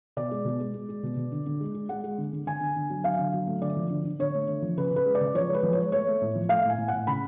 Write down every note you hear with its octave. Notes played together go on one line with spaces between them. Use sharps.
B2 D5
G#3
B2
G#3
G#3
G#3
B2
B2
D3
D3
G#3
G#3
G#3 F#5
G#3
D3
D3
D3 G#5
D3
D3
F#3
F#3 F5
D3
F#3
A3
D3 D5
F3
D3
D3
D3 C#5
A3
D3
F3
C#3 B4
C#3
B4
G#3
D5
C#3
F3 C#5
G#3
B4
F3
G#3 C#5
A3 C#5
A3
A2
F3
A3 F5
A2
G#5
A2
A2 F#5
C#3 B5